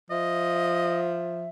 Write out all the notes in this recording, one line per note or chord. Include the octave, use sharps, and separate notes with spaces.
F3 D#5 E5